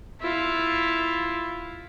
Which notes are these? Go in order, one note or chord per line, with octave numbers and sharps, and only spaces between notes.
E4 F4